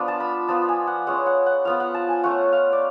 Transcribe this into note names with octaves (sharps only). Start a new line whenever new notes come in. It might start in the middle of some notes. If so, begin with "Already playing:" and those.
Already playing: F3 B3 D4 F4
A5
B5
F3 B3 F4 A5
G#5
F#5
G#3 C#4 F4 F#5
F#5
F#5
F3 B3 F4 F5
F#5
A5
G#5
A3 C#4 F4 F#5
F5
D5